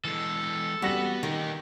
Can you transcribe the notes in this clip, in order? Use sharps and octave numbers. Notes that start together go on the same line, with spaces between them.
E3 G#3 A4
G3 B3 F#4 A#6 F#7
D#3 D#4 G4